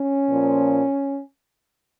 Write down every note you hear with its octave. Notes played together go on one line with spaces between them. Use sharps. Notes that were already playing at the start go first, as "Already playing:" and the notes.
Already playing: C#4
A#2 F3